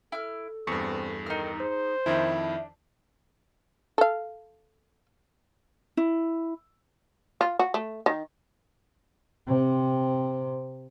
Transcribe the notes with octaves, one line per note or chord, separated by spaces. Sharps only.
E4 A4 F6
E2 G2 C4 C#6
D#3 D#4 F6
G#4 C5
F2 D#3 D4 E4 E5
A4 F5
E4
F4
F#4
A3
D#3
C3 C4